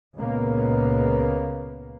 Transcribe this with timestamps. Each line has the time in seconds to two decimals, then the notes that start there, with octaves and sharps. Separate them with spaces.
0.16 C#2 A#2 C#3 A#3 B3